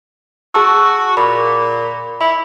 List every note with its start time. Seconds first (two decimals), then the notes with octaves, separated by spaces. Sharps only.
0.54 F#4 G#4 A5 E6
1.17 A#2 B5
2.21 E4 B5